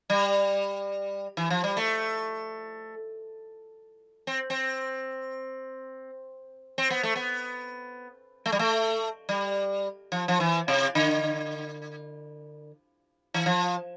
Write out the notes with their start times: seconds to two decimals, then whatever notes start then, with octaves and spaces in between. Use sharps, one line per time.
0.10 G3
1.37 E3
1.50 F3
1.64 G3
1.77 A3
4.27 C4
4.50 C4
6.78 C4
6.90 B3
7.03 A3
7.16 B3
8.46 A3
8.52 G3
8.59 A3
9.29 G3
10.12 F3
10.28 F3
10.40 E3
10.68 C3
10.95 D3
13.34 E3
13.46 F3